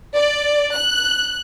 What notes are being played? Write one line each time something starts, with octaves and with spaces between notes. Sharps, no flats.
D5
F#6